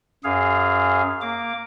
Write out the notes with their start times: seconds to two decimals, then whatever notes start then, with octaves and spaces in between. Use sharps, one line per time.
0.24 F#2 G#4 F5
1.22 A#3 D6